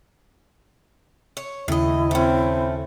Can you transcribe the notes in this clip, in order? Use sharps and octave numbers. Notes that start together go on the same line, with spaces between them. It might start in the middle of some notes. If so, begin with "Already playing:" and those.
C#5
D#2 A2 C#3 E4 D#5
A3 C4 C#4